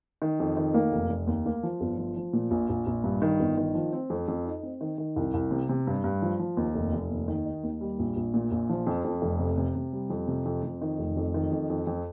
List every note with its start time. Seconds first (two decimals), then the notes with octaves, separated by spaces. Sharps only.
0.22 D#3
0.40 F2
0.57 D#3
0.74 A#3
0.92 F1
1.09 F1
1.27 D#2
1.46 A#3
1.63 F3
1.81 G1
1.98 F3
2.16 F3
2.33 A#2
2.51 A#1
2.69 A#1
2.87 A#1
3.04 G2
3.22 D#3
3.40 G1
3.57 D#3
3.74 F3
3.93 C4
4.10 F2
4.28 F2
4.46 D#4
4.63 C4
4.81 D#3
4.98 D#3
5.16 C2
5.34 C2
5.51 C3
5.69 C3
5.87 G2
6.04 G2
6.22 F3
6.39 F3
6.57 D#2
6.75 F1
6.92 F1
7.11 D#2
7.28 D#3
7.46 D#4
7.63 D#2
7.81 G3
7.99 A#1
8.16 A#1
8.34 A#2
8.52 A#1
8.69 F3
8.87 F2
9.04 F2
9.22 F1
9.39 C3
9.58 C3
9.76 C3
9.93 G3
10.10 F2
10.28 C3
10.45 F2
10.63 F2
10.82 D#3
10.99 F1
11.17 F2
11.34 D#3
11.51 F2
11.70 F2
11.87 F2